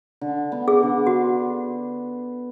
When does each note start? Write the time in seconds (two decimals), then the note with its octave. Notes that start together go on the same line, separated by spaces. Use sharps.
0.21 D3
0.52 B3
0.68 G#4
0.83 D3
1.07 F#4